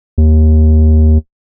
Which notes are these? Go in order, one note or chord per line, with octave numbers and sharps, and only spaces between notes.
D#2